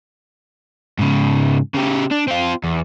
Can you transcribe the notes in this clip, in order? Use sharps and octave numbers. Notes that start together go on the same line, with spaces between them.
G#2 C#3
C#3 G4
D4
C4 F4
E2